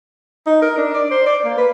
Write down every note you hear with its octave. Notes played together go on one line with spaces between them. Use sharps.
D#4
A#4
D4
D5
C5
D5
A#3
B4